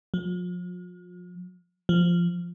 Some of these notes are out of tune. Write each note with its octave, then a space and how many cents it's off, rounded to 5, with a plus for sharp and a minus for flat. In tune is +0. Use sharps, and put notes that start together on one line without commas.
F3 +40
F3 -10